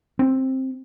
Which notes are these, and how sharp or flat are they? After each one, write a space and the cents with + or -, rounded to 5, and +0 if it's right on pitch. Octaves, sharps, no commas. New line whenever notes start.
C4 +10